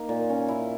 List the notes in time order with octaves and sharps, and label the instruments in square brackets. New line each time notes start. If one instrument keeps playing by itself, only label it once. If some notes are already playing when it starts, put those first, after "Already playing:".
Already playing: [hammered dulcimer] A#3 D#4
A#2
C#4
E4